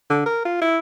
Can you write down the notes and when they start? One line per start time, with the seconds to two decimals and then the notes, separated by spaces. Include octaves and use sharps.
0.10 D3
0.26 A#4
0.45 F4
0.61 E4